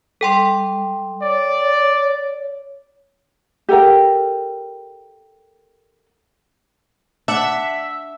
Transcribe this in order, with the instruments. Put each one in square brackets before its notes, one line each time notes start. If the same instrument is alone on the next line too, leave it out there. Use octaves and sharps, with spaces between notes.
[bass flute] G3 [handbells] A4 G5 C6
[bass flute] C#5 [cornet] D5
[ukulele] G4 A4 A#4 G5
[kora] D4 F#5 [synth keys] E5